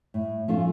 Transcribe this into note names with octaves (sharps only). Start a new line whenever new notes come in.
A2
F3 A3 C#4 F4